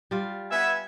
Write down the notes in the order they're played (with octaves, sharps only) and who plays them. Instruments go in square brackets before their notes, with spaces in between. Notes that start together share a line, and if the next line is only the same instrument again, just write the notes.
[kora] G3 F4
[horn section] B3 E5 [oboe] G#5